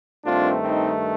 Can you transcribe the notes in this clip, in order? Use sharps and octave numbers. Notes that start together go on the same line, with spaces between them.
G2 D#3 A3 C4 D4 F4
C4 D#4